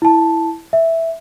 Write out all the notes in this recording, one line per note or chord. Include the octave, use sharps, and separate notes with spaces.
E4 A5
E5